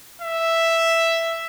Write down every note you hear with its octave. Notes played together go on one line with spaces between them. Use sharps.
E5